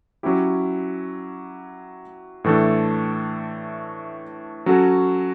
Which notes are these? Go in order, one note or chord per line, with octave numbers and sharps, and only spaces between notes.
F#3 C#4 E4 G4
A2 E3 A3 D4 A4
F#3 C#4 F#4 A4